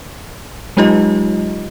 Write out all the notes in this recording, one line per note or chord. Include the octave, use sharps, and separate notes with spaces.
F#3 G#3 D#4 F4 G4 D#5